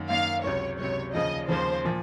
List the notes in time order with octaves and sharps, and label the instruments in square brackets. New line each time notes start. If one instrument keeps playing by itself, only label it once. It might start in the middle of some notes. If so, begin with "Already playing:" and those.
Already playing: [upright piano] F#2 D#3 A#3
[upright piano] F#2 D#3 A#3 [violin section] F5
[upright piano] C#2 C3 F#3 [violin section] C#5
[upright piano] C#2 C3 F#3 [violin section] C#5
[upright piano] D#2 C#3 F3 [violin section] D#5
[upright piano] D#2 C#3 F3 [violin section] C5
[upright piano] A#2 F3